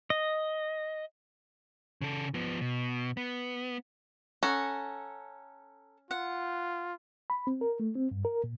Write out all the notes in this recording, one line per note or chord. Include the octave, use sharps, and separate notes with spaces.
D#5
C#3 A4
F3 B3
B2
B3
C#4 A4 F#5 A#5
F4 F#5
B5
C4
A#4
A3
C4
G2
A#4
A#2